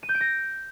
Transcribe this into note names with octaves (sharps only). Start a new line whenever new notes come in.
D#7
G6
D7
A#6